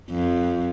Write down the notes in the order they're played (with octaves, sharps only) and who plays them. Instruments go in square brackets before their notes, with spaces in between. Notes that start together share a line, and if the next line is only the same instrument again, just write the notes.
[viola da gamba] F2